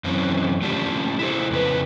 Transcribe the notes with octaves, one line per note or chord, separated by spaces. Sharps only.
F#2 E3 C4 C#4
A3 C#4 D4 F4 G4
E4 A4 C5
F2 C#3 B3 B4